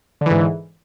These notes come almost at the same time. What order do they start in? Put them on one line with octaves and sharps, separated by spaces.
D3 E3 G#2